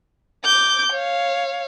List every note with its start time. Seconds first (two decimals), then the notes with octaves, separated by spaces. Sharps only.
0.45 D6 G6
0.93 C#5 F5